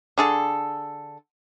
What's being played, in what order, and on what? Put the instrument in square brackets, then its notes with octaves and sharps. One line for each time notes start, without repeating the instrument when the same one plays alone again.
[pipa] D3 G#4 A4